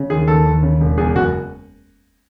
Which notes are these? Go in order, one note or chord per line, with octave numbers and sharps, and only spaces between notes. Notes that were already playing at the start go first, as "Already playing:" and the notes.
Already playing: C#3
D#2 G#4
D#2 A4
D#2
C#3
E1
E2 G#4
F#1 F#4